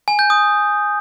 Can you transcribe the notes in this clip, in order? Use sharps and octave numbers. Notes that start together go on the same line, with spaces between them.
G#5
G6
D#6